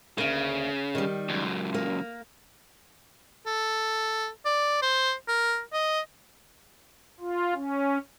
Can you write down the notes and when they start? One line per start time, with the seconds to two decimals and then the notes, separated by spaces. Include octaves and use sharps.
0.18 D2 C#3 A#3
0.95 D#3 G3
1.29 C#2 F#2
1.74 A#3
3.46 A4
4.45 D5
4.82 C5
5.28 A#4
5.73 D#5
7.20 F4
7.54 C#4